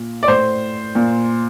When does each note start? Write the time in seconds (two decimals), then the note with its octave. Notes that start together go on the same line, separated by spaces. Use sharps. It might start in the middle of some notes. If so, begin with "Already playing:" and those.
Already playing: A#2
0.23 D5
0.28 A2 C5
0.95 A#2